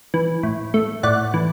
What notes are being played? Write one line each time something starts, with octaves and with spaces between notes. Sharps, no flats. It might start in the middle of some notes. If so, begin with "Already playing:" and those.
E3
A2
A3
A2 D5 F#5
E3